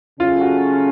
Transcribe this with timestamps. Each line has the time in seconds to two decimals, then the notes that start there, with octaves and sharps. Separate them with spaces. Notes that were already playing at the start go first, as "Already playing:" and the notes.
0.20 C#3 F#3 A3 C#4 F4
0.41 F#4